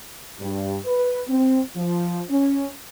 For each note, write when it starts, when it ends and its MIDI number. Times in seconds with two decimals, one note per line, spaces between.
0.40 0.77 43
0.85 1.21 71
1.28 1.61 60
1.76 2.20 53
2.30 2.69 61